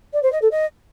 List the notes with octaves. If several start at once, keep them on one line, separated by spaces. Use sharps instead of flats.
D5
C5
D#5
A4
D#5